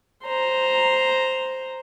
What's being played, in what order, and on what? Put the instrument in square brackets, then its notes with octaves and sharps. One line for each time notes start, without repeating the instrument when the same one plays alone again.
[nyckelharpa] C5 A#5